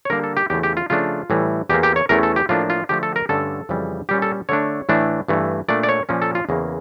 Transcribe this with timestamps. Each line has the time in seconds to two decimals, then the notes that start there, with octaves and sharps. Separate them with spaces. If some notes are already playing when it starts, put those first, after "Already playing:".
0.05 C#5
0.10 D3 G3 A#3 D4 A#4
0.24 A4
0.37 G4
0.50 E2 C#3 E3 A3 G4
0.63 G4
0.77 F4
0.90 C#3 F3 A3 D4 F4
1.30 A2 E3 G3
1.69 E2 E3 A#3 G4
1.83 G4
1.96 C#5
2.09 E2 E3 A3 C#4 A#4
2.23 A4
2.36 G4
2.49 A2 F3 A#3 D4 F4
2.70 F4
2.89 D3 F3 A3 G4
3.03 A4
3.16 A#4
3.29 G2 D3 A3 C#4 A4
3.69 F2 C#3 E3 G3
4.09 A#2 G3 C#4 G4
4.22 A4
4.49 D3 A3 D4 C#5
4.89 A2 E3 A3 D4
5.28 G2 E3 A3
5.68 A#2 A3 D4 D5
5.83 D5
5.89 C#5
6.09 A#2 F3 A#3 C#4
6.22 A4
6.35 F4
6.49 E2 C#3 E3 A#3 C#4